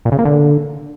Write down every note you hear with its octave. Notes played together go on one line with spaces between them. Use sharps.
A#2
C#3
A#3
D3